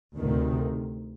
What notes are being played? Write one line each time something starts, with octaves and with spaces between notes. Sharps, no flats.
D2 C3 D#3